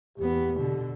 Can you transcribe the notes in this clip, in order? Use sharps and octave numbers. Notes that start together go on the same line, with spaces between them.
E2 B3 G4
B2 D3